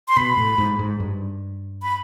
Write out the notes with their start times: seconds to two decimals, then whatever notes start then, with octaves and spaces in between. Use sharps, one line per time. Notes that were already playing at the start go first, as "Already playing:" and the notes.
0.08 C6
0.17 B2 B5
0.37 A2
0.58 G#2
0.79 G#2
1.00 G2
1.82 B5